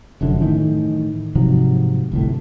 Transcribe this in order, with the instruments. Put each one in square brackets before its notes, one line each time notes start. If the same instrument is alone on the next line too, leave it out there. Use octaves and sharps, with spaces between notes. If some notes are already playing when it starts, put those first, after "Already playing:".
[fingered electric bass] F1 F#2 D3
A2 D#3 E3
G#2 C3 F3 F#3
G1 C2 A2